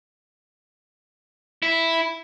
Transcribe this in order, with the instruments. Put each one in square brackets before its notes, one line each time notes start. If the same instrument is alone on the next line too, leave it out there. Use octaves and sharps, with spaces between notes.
[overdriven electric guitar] E4